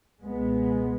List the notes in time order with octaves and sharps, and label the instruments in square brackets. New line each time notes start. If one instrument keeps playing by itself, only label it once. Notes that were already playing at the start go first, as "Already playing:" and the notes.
[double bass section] C#2 B2 G#3 B3